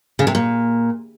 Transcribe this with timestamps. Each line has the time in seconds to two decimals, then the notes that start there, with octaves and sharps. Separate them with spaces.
0.19 C#3
0.27 C3
0.35 A#2